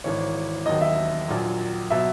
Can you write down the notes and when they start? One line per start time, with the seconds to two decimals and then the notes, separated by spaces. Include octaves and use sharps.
0.04 G#1 G#2 E3 C#5
0.66 E1 D#2 D#3 F#3 D#5
0.81 E5
1.28 A#1 A#2 F#3
1.90 B2 F#3 E5